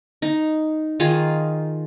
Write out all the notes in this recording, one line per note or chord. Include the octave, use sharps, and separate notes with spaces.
D#4
D#3 D#4 F4 G#4